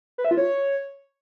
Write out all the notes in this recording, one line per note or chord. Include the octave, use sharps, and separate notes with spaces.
B4
E5
F4
C#5